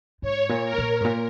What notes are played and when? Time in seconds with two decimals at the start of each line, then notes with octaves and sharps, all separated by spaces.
0.22 G#2 C#5
0.49 A#2
0.64 A#4
0.78 A#2
1.01 G#2
1.05 A#2